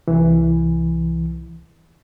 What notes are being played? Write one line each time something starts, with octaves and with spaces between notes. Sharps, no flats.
C2 E3